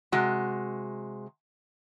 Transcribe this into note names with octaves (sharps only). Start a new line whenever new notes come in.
C3 G#3 F#4